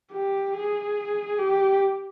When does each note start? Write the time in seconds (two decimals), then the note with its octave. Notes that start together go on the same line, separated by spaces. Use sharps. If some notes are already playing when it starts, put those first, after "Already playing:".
0.12 G4
0.54 G#4
1.39 G4